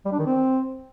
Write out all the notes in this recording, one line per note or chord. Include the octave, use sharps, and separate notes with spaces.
G3
D4
D#3
C4